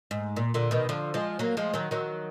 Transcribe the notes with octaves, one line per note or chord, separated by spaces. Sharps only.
G#2
A#2
A#2 D3
B2 D#3
D3 F3
F3 G#3
F#3 A#3
F3 G#3
D#3 F#3
D#3 F#3